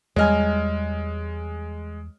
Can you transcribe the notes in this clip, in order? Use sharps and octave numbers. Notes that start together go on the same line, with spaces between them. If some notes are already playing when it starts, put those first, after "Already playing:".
E2 G3 G#3 C#5 D#5 G#5 F6